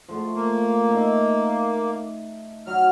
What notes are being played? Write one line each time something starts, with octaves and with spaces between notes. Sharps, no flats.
F3 A3
A#3
D#4 E5 F5
F#3 F6